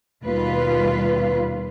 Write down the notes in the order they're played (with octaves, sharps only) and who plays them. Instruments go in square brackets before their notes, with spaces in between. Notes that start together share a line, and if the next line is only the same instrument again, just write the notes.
[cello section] D#2 B2 G3 F4 B4